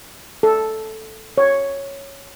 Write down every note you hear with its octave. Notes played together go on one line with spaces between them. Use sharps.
A4
C#5